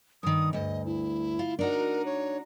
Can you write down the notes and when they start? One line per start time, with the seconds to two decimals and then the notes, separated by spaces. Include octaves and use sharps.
0.23 G2 D#3 D#6
0.53 D2 G2 D#5
0.86 E4
1.39 F4
1.59 D4 D#4 F#4 A#4
2.06 C#5